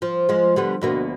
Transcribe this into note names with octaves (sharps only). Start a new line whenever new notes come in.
F3
F3 G#3
D3 G3 B3
D2 B2 A#3